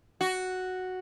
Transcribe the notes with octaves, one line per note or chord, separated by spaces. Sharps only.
F#4